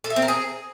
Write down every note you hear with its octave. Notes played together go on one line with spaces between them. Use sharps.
A4
E5
C4
A#4
G#4